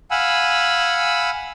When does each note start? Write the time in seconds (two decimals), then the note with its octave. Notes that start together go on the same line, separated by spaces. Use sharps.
0.11 F5 F#5 G#5 B5 E6